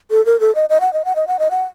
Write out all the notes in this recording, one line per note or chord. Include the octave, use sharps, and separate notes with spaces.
A4
A#4
A4
D#5
D#5
F#5
D#5
F#5
D#5
F#5
D#5
F#5